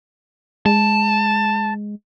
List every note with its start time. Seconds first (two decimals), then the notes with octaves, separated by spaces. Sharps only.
0.66 G#3 A5